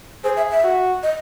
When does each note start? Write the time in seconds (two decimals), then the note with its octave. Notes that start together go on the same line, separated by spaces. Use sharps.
0.24 G#4 C5
0.36 E5
0.51 E5
0.64 F#4
1.03 D#5